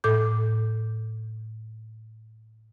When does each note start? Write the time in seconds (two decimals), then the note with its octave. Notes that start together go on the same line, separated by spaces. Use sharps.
0.04 A2 A4 D6 G6